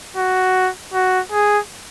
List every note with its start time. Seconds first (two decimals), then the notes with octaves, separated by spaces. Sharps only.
0.17 F#4
0.94 F#4
1.32 G#4